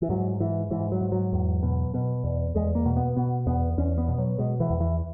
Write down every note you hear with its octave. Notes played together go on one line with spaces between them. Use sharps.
E3
G#2 F#3
G#2 E3
G#2 E3
F#3
G#2
F#3
E2
B2
B2
E2
E2 G#3
A#3
B2
B3
B2 B3
E2 B3
E2 C#4
B3
B2
F#3
B2 G#3
E3
E2
E3